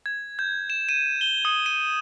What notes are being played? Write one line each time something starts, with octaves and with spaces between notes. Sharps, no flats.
G#6
G6
E7
D#7
G7
D#6
D#7